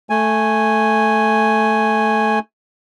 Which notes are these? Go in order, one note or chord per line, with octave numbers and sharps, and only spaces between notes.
A3 G#5